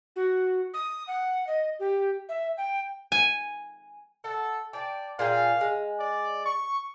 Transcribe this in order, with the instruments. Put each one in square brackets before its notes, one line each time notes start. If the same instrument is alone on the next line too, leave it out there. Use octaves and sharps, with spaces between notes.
[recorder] F#4
D#6
F#5
D#5
G4
E5
G5
[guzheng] G#5
[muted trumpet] A4 [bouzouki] F#5
[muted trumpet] D5 [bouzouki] G5 A5
[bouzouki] A#2 G#4 G5 [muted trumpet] F5
[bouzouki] G#3
[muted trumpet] D5
C#6